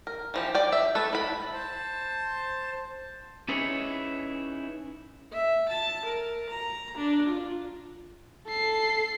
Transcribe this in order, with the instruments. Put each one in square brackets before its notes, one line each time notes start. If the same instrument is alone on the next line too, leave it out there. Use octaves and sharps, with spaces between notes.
[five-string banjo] A#4
E3 F3 G4
D5 G5
E5
A3 A4 B4
E4 B5
[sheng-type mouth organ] C5 A5
[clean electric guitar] C#4 D#4 E4 G#4 B4 C#5
[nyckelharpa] E5
A5
A#4
A#5
D4
F4
[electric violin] A4 C7